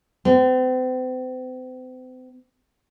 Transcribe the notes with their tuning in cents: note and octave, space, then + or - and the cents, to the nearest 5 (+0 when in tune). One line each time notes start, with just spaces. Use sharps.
C4 -40